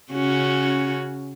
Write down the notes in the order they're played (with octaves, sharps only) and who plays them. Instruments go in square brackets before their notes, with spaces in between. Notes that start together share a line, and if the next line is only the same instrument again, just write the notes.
[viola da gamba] C#3 C#4 F#4